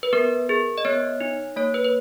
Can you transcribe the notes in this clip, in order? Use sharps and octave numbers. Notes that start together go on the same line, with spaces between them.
B4
B3 A#4
G#4
D#5
B3 C#5
D#4
A#3 C#5
B4
B4